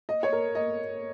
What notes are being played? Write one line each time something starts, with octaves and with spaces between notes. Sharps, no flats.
D#5
C#5
A#4
D#5